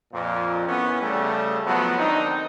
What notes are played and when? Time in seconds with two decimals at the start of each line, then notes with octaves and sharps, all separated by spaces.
0.12 F2 A#2
0.67 E3 B3 C#4
1.01 C#3 G3 A3
1.65 F3 F#3 A3 B3
1.97 D#3 C4 D4 D#4